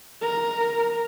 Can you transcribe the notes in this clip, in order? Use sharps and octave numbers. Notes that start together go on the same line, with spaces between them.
A#4